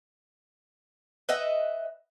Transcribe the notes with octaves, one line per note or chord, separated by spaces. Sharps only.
B4 D#5 E5 F#5